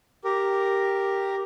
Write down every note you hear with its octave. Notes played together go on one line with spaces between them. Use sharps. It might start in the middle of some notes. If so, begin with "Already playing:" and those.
G4 A#4